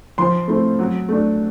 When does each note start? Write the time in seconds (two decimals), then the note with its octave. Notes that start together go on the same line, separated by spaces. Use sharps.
0.18 F3 C6
0.48 A3 C4 E4
0.79 F#3
1.09 A3 D4